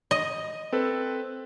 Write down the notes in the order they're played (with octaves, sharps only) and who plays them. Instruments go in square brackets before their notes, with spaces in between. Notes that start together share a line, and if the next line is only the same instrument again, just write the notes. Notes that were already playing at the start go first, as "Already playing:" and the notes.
[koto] D#5
[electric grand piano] C4 A4 B4